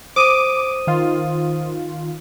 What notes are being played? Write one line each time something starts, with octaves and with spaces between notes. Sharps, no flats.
C5 D6 D#6 D#7
D#3 F4